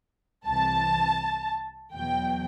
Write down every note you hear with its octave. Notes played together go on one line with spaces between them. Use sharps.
C2 C3 E3 A5
E2 B2 F#3 G5